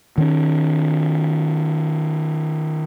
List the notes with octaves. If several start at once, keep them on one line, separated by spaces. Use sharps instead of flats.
D#3 C#4